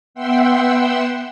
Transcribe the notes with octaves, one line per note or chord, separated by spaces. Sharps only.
B3 E5 F#5 G5 C6 E6